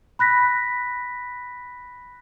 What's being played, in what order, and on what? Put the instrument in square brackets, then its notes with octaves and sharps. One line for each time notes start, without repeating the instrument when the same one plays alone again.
[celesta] B5 F#6 A#6 B6